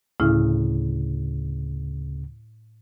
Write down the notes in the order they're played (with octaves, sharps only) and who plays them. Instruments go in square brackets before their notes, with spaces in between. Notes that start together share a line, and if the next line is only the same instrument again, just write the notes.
[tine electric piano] D2 C#3 [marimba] A2 E4 F6